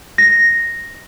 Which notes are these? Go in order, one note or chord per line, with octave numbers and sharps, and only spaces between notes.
A#6